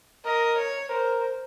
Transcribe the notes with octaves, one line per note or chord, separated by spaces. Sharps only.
A#4 D#5
C#5
A#4 C5